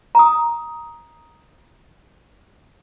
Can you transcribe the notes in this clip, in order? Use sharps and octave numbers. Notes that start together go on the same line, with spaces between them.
A#5 D#6